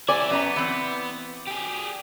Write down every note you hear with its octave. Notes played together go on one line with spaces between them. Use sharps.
E4 G4 C#5 D5 G#5
F#2 B3 A#5
E3 C4
G4 G#4